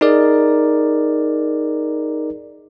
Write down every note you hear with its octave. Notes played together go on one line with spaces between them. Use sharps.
D#4 G#4 A#4 D5